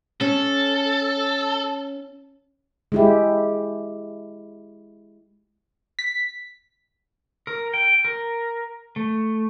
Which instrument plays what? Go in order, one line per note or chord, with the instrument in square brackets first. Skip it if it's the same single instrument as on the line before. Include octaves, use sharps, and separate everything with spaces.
[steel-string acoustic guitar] C#4 [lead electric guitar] A4
[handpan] G#3 E4 G4
[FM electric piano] B6
[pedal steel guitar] A#4
G5
A#4
A3